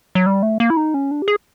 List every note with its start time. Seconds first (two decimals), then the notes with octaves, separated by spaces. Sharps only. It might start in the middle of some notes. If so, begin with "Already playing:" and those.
0.15 F#3
0.26 G3
0.43 A3
0.60 A#3
0.70 E4
0.77 D#4
0.94 C#4
1.11 D4
1.22 G4
1.28 G#4